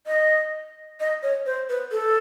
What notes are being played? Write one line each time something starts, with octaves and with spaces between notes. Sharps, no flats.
D#5
D#5
C#5
C5
B4
A4